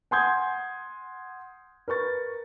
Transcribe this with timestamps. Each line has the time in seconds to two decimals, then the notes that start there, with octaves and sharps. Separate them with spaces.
0.11 F#5 G#5 C6 D#6 G6 G#6
1.88 A#4 B4 C#6 A6